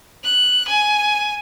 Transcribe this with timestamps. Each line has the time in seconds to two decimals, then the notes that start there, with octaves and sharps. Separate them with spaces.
0.24 F#6
0.68 G#5